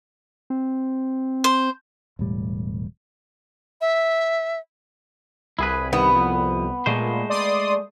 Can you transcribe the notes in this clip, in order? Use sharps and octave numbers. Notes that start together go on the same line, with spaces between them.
C4
C5
E1 A2 G3
E5
C2 E4 G#4 B4
G2 D#3 B3
F2
A#2 G#3 A3 C5
D5 C6 D#6